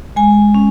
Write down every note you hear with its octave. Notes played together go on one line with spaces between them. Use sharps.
G#3 G#5
C#4